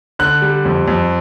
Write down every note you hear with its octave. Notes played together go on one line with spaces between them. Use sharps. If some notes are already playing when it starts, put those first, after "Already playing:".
D3 F#6
G3
F2
F2